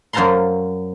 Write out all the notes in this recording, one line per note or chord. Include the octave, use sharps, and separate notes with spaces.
F#2 C5 F5 A5 A#5 C6